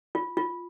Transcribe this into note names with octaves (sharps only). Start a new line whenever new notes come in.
F4
F4